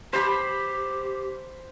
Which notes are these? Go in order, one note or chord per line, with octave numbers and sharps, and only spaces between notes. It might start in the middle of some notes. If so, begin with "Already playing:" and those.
G4 C5 B5